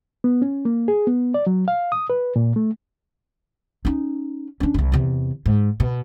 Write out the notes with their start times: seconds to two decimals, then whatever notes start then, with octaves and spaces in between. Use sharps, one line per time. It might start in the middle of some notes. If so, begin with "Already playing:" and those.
0.24 B3
0.42 C#4
0.65 A#3
0.88 G#4
1.07 B3
1.34 D5
1.47 F#3
1.68 F5
1.92 D#6
2.10 B4
2.36 A#2
2.56 A3
3.85 C#4 D#4
4.60 C#4 D4
4.74 D#1 C2
4.92 E2 C3
5.46 G#2
5.80 B2